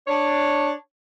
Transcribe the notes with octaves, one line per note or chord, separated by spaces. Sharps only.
D4 C#5